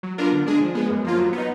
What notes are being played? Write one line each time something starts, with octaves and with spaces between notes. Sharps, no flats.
F#3
B3 D4 F4 A#4
D3
G#3 D4 G#4
F3
G#3 B3
F#2
F3 A#3 F4
F#3
B3
D#4